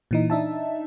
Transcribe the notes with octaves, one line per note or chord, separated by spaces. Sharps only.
A#2 E3 D#4
D4 D#4 E5 A5